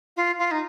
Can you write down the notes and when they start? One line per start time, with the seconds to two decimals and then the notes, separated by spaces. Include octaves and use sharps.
0.16 F4
0.38 F4
0.51 D#4